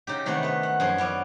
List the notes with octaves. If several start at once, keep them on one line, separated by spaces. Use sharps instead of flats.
C#3 D#4 G4
C3 D#3 G#3 A3 B4 F#5
B3 B4
F#5
F#2 F3 G#4
B3 C#4 D5